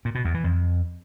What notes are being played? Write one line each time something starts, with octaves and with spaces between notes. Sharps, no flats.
A#2
B2
E2
E3
F2